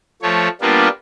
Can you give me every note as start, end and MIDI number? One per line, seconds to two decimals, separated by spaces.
0.22 0.48 53
0.22 0.48 57
0.22 0.48 73
0.61 0.88 55
0.61 0.88 58
0.61 0.88 59
0.61 0.88 62
0.61 0.88 65